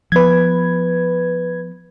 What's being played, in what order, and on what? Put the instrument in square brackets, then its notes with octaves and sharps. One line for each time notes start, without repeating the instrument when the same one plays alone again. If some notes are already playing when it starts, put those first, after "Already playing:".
[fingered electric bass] F3 B3 [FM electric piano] B4 G#6